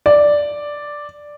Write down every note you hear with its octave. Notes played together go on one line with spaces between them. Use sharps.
D5